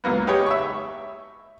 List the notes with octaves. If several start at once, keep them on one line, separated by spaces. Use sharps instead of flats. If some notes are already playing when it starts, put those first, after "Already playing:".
C#2 F#3 A#3 B3
D#4 G4 G#4 B4 C#5
E5 B5 C#6